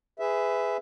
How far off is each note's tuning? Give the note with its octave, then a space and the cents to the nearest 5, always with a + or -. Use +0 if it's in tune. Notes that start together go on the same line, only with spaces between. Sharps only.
G#4 -5 B4 +20 E5 +0